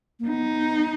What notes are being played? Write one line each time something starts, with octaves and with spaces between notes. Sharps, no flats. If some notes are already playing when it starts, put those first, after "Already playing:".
A#3
B3 D#4